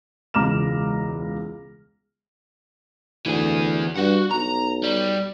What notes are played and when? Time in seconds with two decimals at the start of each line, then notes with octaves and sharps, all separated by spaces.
0.34 E1 C#2 A#5 D6 F6 E7
3.26 D2 E3 G#4
3.96 G2 F#4 F#5
4.31 B1 A#5
4.83 G3